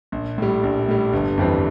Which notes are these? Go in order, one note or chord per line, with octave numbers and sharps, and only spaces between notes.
A#1
A2 G3
A#1
A2 G3
G1
F2 E3 G3 C4